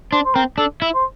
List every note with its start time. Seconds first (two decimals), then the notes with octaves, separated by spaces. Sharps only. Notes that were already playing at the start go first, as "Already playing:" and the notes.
0.12 D4 C5
0.25 C5
0.35 C4 A#4
0.58 D4 A4
0.82 E4 E5
0.94 C5